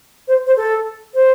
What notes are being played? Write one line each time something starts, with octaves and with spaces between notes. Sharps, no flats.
C5
C5
A4
C5